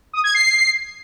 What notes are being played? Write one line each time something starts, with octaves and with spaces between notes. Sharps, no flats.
D#6
G#6
C7